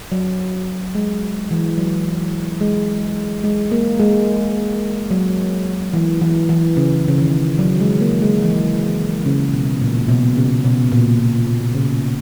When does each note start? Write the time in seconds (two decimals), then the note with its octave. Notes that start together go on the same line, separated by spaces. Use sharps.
0.12 F#3
0.95 G#3
1.51 E3
1.78 F#3
2.61 G#3
3.44 G#3
3.72 A#3
4.00 G#3
5.11 F#3
5.93 E3
6.21 E3
6.49 E3
6.77 C#3
7.08 C#3
7.18 D#3
7.59 F#3
7.80 G#3
8.01 A#3
8.22 G#3
8.43 E3
9.25 C#3
9.53 B2
9.81 A#2
10.09 B2
10.36 C#3
10.64 B2
10.92 A#2
11.74 C#3